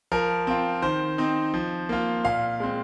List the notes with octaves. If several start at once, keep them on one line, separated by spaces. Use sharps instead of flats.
F3 A#4
C4 F4
D#3 C5
C4 D#4
F3
A#3 F4
A#2 F5
G#3 C4